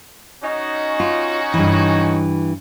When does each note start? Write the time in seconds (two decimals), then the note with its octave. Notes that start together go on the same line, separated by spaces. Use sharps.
0.43 C#4 D#4 F#4
1.00 F4
1.54 G2 E3